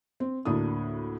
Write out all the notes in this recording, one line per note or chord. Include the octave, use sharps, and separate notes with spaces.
C4
D2 A2 A#3 D4 D#6